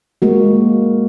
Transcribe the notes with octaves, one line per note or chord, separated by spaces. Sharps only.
G#3 A#3 F#4